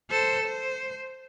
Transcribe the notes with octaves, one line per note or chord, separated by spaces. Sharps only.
A4 C5
C5